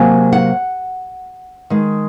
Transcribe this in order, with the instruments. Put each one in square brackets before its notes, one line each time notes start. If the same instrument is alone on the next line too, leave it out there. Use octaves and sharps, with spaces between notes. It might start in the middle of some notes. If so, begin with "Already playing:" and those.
Already playing: [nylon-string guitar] C3 F#3 A#3 G#5
F#5
D#3 G#3